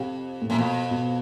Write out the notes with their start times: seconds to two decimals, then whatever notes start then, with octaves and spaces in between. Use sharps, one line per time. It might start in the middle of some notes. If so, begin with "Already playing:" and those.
Already playing: F2 C3
0.42 A2
0.49 F#2 A#2
0.58 F2 B2
0.91 B2